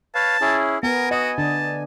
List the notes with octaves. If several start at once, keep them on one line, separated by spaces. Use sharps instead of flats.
B4 C#5 F5 A5
C#4 E4 G#4
B3 A#4 G#5
F#4 D#5
D3 D4 A5